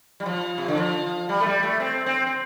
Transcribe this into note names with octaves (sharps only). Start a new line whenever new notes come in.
G3
F3
C3
D3
F3
G3
A3
G3
A3
C4
C4
C4